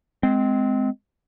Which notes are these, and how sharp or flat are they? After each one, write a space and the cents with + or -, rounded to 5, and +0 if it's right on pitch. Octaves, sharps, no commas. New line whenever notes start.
G#3 +15 C4 -20